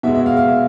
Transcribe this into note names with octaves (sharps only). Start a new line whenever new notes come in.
B2 G#3 E5
E5
F5
F5
E5